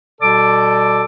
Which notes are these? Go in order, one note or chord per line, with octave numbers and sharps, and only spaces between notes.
B2 G3 A4 D5 D6